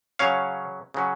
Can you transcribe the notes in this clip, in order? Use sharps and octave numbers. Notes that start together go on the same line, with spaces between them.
C#3 F#3 C#4 C#5 F5
C#3 F#3 C#4